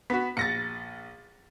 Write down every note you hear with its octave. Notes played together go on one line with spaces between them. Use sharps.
B3 F#4 B6
A#1 A6 A#6 C#7